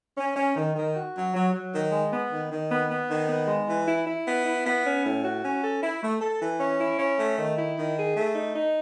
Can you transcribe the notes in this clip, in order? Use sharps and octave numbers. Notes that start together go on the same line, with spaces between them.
C#4
C#4
D#3
D#3
F#4
F#3
F#3
F#3
D#3
G#3
B3
D#3
D#3
B3
B3
D#3
B3
G#3
E3
E4
E4
B3
E4
B3
C#4
A2
F#4
C#4
A4
E4
A3
A4
E3
C#4
E4
C#4
A3
D#3
E4
D#3
G#4
A3
D#4
D#4